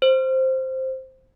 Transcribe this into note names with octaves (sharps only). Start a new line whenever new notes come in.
C5